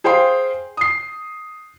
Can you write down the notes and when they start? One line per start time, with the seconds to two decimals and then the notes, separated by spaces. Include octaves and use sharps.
0.04 G#4 C5 F5 G5 C6
0.77 D#6 C7